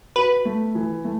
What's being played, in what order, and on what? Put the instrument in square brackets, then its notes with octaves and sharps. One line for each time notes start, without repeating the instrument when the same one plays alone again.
[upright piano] F#4 [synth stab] B4
[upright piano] A3
E3
A3